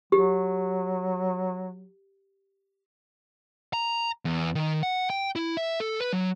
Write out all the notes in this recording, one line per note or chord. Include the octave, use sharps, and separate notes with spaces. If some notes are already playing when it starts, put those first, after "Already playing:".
F#3 G4
A#5
E2
D#3
F#5
G5
E4
E5
A4
B4
F#3